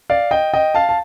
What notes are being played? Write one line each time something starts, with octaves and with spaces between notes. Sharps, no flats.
D5 F5
D#5 G5
D#5 G5
F5 A5
A5